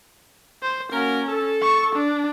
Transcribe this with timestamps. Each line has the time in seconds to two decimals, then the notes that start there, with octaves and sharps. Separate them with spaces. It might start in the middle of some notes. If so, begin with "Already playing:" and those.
0.63 C5
0.92 A#3 C#4 F#4 A#4
1.28 A4
1.62 C#6
1.95 D4